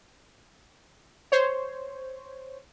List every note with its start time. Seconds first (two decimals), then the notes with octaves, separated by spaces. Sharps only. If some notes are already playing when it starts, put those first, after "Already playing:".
1.32 C5 C#5